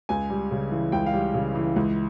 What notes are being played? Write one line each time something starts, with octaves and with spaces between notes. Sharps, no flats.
C#2 G#5
G3
C#3
E3
C#2 G5
F5
G3
C#3
E3
C#2